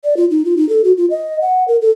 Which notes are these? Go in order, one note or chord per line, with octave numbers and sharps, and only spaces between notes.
D5
F4
D#4
F4
D#4
A4
F#4
F4
D#5
F#5
A#4
A4